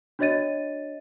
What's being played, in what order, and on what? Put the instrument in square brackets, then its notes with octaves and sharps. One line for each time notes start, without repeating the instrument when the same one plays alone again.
[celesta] D4 F#4 C#5 D#5 A6 D#7